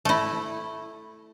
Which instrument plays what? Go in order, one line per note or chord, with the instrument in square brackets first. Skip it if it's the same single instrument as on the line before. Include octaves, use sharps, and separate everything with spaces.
[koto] A3 E4